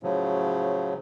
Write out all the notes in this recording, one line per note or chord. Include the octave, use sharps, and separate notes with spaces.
A2 C#3 F3 F#3